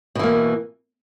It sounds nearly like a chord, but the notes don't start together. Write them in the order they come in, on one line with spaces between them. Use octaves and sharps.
B2 E3 A#3